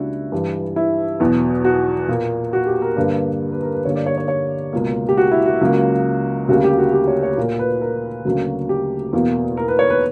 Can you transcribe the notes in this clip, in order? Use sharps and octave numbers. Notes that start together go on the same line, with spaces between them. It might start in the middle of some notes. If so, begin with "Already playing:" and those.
Already playing: C#2 C#3 G3 A#3 D4 E4 F#4
G2 E3 G3
E4
E2 B2 F#3
F#4
A#2 A#3
F#4
G4
A#4
G2 D3 G3 A#3 B4
B4
A#4
B4
G2 D3 G3 A#3 C#5
D5
C#5
C#5
C#5
C#2 B2 A#3
G4
F#4
E4
F#4
C#2 C#3 F#3 A#3
D2 C#3 G3 A#3 F#4
G4
F#4
G4
C#5
C#5
A#2 A#3 A#4
B4
A#4
D2 C#3 F#3 A#3
G4
E2 B2 A#3
A#4
B4
C#5
B4